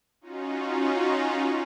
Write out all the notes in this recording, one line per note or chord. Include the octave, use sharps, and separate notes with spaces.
C#4 D#4 F4 F#4